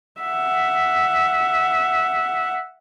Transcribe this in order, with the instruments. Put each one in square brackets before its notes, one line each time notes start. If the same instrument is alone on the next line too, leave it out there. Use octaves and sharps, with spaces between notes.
[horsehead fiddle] E5 F#5